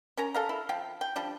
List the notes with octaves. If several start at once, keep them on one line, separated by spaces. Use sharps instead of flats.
C#4 A#4 A#5
A4 F5 A#5
E4
F3 F5 G5
G5
F3 G3 D4